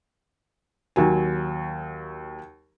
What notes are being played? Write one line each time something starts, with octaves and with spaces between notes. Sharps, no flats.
D#2 F#3 G#5